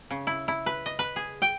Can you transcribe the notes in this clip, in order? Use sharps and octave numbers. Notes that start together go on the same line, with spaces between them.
C#3
E4
E4
B4
D#5
B4
G#4
G5